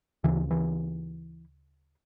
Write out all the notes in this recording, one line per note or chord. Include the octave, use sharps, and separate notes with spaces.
D2 C#3 E3
E3